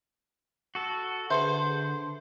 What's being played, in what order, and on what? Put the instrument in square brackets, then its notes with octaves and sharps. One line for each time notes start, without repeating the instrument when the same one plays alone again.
[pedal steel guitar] F#4 A4
[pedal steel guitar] D3 [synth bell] G#4 B4 E5 [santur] C5